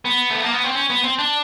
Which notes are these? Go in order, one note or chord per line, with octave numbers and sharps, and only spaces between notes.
B3
A3
A#3
B3
C4
C#4
B3
C4
D4